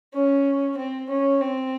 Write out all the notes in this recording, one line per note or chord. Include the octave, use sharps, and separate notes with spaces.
C#4
C4
C#4
C4